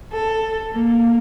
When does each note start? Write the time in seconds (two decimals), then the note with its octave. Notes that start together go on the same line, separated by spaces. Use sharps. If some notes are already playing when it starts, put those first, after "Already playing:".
0.11 A4
0.71 A#3